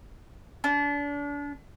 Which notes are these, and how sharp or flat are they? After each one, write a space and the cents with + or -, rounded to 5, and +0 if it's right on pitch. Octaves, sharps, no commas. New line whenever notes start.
D4 -35